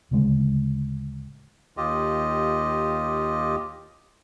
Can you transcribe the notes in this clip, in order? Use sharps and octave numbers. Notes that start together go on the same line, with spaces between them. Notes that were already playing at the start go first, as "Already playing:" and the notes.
D1 D2 C#3 G#3
D#2 F4 G4 D#5